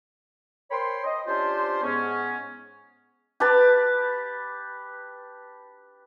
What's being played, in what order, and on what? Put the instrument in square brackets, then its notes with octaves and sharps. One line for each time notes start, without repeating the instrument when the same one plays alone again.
[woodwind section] A#4 C5 C#5 G5 B5 C6
D#5
C#4 D4 F4 G4 C5
G#2 B3 C#4
[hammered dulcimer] G4 B4 A5